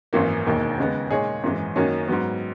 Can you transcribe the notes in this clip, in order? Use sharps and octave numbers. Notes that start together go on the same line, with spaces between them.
G#1 F#2 E3 A#3
E1 D#2 D#3 A#3
D#2 C#3 G#3 B3
A#2 G#3 D#4 G#4 C#5
G#1 F#2 E3 G#3
F#2 D#3 A#3 C#4 F#4
G#2 F#3 B3